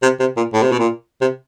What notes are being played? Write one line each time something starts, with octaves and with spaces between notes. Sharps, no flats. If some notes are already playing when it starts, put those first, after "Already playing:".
C3
C3
A#2
A2
C3
B2
A#2
C3